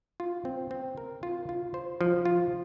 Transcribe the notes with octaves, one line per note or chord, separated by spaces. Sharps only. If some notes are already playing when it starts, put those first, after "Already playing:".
F4
C4
C4
A#4
F4
F4
C5
F3
F4